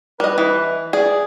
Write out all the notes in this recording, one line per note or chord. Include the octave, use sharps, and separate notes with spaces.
G3 B4 D#5
E3
G#4 D5